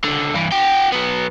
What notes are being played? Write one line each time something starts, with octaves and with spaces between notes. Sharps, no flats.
C#2 D3
G2 E3
F#4 G5
F#3 B3